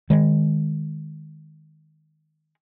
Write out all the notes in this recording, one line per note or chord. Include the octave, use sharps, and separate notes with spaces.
D#3 G#3